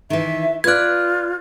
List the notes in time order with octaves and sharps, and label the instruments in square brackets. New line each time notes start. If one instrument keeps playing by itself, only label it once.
[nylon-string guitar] D#3 E3 [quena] E5
[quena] F4 [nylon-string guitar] B4 D5 [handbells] F#6 G#6